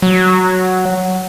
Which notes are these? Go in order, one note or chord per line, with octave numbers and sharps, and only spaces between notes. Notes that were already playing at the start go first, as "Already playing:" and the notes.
F#3